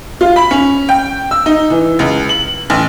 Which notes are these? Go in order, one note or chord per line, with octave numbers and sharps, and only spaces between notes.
F4
B5
C#4
G5
E6
D#4
E3
C#2
F#7
A1